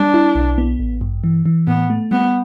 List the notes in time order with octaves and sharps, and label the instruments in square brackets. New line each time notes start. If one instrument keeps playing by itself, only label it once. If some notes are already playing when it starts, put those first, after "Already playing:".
Already playing: [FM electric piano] G3 [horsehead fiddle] D4
[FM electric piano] E4
B1
B3
A1
G2
E3
E3
[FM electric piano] A2 [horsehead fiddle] B3
[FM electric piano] A3
[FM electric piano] G3 [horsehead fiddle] B3